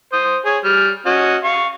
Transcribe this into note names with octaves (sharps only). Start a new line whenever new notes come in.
C5 D#6
G#4 C#5
G3 F6
C#4 F#4 D#5
F5 C#6